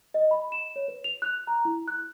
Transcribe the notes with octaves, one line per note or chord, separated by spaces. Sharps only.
D#5
B5
E7
C#5
B4
F7
F#6
A#5
E4
F#6